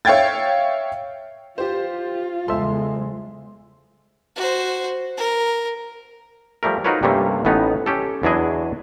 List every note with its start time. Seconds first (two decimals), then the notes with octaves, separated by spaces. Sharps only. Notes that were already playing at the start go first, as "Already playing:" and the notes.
0.05 C#5 E5 F5 G5 G#6 A6
1.58 F4 G4 C5
2.48 E2 C#3 G#3 A4 C5 E5 C6
4.36 F#4 C5
5.18 A#4
6.63 F3 G3 A3 A#4
6.84 D#4 F4 F#4 A#4 B4 C#5
7.03 G2 C3 G3 A3 A#3 C#4
7.45 A1 A2 B3 C#4 D#4
7.86 C#4 G4 A4
8.23 E2 F#3 D4 E4 G#4 D#5